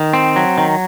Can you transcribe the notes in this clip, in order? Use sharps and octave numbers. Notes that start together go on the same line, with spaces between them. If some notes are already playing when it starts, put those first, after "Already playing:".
Already playing: D#3
C4
F#3
D#3